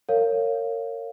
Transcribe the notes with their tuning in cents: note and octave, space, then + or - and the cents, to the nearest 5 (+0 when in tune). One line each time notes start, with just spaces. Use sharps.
A#4 -30 C#5 +0 F5 +0